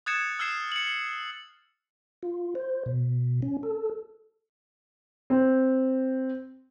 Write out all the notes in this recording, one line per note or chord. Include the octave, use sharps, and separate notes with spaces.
D#6 F#6 G#6 A6 C#7 E7
E6 F6 G#6 C7 E7
C#7 F#7
F4
C5
B2
C#4
A4
C4